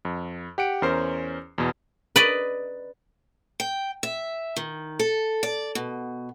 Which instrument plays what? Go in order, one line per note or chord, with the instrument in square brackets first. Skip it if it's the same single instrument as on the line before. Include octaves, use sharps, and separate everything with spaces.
[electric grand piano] F2
G4 F#5 D7
E2 C#4 A#4 C5 C7
E2 B2
[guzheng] B4 D5 D#5
[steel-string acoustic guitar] G5
E5
D#3
A4
D5
B2